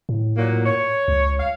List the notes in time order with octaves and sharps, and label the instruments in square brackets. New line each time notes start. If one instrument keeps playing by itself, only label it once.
[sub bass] A2
[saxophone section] A#2 F#3 A#3
C#5
[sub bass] C#2
[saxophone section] F5